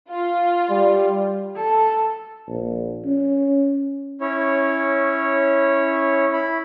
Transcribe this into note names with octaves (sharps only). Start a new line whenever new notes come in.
F4
G3
A4
A#1
C#4
C#4 E4 C#5
E4 B5